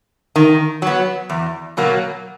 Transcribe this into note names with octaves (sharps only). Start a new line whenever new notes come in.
D#3
F#3 B3
E2
B2 F#3 A#3